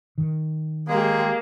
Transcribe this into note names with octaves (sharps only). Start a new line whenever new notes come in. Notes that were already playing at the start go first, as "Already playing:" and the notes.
D#3
G#3 A#3 G4 G#4